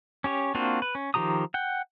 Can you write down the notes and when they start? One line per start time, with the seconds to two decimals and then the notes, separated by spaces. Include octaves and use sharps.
0.24 C#4 G4 C#5
0.55 A#3 C4 D4 F4 F#4
0.82 B4
0.95 C#4
1.14 D#3 F3 G4 A#5 D#6
1.54 F#5 G5